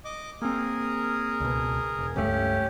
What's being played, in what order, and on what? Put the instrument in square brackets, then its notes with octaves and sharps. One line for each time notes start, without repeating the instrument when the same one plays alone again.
[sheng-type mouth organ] D#5 D6
[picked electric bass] A#3 C4 [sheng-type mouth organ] G#4 A#4
[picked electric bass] C#2 B2
E1
[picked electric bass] C#2 G2 A3 [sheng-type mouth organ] C#4 G4